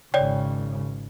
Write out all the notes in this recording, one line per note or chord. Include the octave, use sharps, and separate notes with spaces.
G#1 C#3 C#5 D5 G5